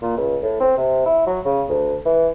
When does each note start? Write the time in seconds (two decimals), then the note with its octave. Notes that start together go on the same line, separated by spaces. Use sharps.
0.02 A#2
0.17 C#2
0.43 A2
0.60 C4
0.77 C3
1.06 E4
1.27 F#3
1.45 C#3
1.69 D2
2.05 E3